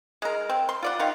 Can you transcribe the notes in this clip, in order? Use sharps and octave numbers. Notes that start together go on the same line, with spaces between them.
G#3 A#4
C4
C6
F4 D5 F#5
D#3 F4